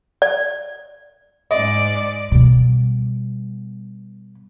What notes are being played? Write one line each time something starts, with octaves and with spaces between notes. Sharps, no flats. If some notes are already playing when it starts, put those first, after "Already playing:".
D5
G#2 D5 D#5
B2 G3